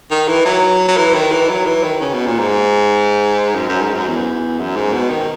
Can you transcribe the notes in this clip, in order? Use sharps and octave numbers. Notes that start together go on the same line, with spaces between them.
D#3
E3
F#3
F#3
E3
D#3
E3
F#3
E3
D#3
C#3
B2
A#2
G#2
F#2
F#2
G#2
F#2
E2
F#2
G#2
B2
D#3